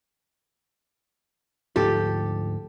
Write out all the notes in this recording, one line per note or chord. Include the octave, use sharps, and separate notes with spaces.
D2 G#2 F3 G4 A4